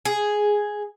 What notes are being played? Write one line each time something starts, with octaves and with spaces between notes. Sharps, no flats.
G#4